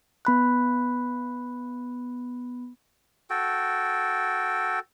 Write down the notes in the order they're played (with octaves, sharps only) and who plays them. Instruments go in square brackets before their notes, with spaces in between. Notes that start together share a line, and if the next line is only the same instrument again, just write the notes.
[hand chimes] B3 B5 F#6
[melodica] F#4 A4 G5